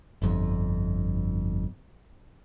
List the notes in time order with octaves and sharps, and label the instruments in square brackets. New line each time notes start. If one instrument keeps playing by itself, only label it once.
[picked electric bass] G1 F2